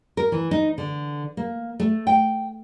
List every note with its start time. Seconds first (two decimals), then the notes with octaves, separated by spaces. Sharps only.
0.17 A#4
0.32 E3
0.51 D#4
0.78 D3
1.37 A#3
1.80 A3
2.07 G5